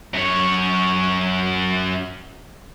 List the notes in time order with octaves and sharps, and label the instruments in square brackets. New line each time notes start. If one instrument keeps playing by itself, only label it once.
[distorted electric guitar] F#2 C#5